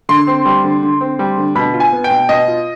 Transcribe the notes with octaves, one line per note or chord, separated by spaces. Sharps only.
D3 C6
C4
G3
D3
D3
C4
G3
D3
B2 B5
F4
G#5
B3
G5
B2
B2 D#5
F4